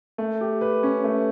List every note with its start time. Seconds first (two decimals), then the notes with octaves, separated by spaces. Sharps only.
0.18 A3
0.41 G4
0.61 B4
0.83 C#4
1.04 A3